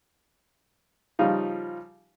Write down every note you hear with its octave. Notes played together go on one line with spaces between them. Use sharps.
C#3 F3 G3 D#4 F4